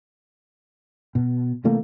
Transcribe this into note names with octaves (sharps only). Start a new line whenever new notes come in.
B2
C3 E3 A3 A#3